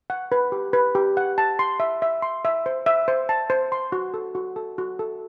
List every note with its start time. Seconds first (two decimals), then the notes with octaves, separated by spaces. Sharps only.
0.10 F#5
0.32 B4
0.52 G4
0.73 B4
0.95 G4
1.17 F#5
1.38 A5
1.59 C6
1.80 E5
2.02 E5
2.22 C6
2.45 E5
2.66 C5
2.86 E5
3.08 C5
3.29 A5
3.50 C5
3.72 C6
3.92 F#4
4.14 A4
4.35 F#4
4.56 A4
4.78 F#4
4.99 A4